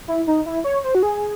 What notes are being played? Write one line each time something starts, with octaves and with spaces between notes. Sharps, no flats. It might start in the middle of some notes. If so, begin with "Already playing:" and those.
E4
D#4
E4
C#5
C5
F#4
G#4